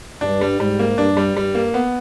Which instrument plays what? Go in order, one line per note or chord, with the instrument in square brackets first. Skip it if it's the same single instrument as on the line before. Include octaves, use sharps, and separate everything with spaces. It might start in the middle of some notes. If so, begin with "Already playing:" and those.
[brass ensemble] G2 [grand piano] D4
[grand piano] G3
[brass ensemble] G#2 [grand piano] G3
[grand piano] A#3
[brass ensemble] G2 [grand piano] D4
[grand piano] G3
[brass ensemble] G2 [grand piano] G3
[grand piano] A#3
B3